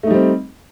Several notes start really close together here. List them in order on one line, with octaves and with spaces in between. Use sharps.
A3 D#4 G3 C4